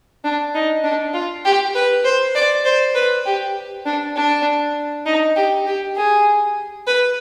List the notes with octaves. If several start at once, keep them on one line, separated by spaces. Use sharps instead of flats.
D4
D#4
D4
F4
G4
B4
C5
D5
C5
B4
G4
D4
D4
D#4
G4
G4
G#4
B4